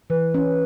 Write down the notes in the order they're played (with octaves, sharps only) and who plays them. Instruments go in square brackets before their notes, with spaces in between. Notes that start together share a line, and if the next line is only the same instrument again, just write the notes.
[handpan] E3 [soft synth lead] B4
[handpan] C#4